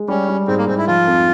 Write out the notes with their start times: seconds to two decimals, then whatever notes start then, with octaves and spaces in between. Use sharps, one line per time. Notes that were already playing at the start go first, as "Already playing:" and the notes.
Already playing: G#3
0.08 G3 C#4
0.28 G3
0.48 G#2 C4
0.58 A#3
0.67 G#2 C4
0.78 E4
0.87 F3 F4
1.07 F2